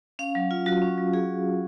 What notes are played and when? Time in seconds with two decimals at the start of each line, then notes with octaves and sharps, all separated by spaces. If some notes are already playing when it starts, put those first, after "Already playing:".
0.19 C#4 F5
0.35 F#3
0.51 F4
0.66 F#3 F#4
0.82 C#4
0.98 F#3
1.13 F4 G#4